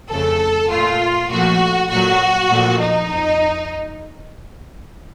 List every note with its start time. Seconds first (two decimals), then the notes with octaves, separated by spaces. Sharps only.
0.11 F2 C#3 A3 A4
0.71 A#2 A3 F4
1.31 A#2 F3 A3 F#4
1.91 A#2 F#3 A3 F#4
2.51 A#2 F3 A3
2.81 D#4
3.11 F2